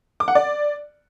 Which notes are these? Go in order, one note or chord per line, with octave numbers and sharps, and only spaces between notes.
D6
F#5
D5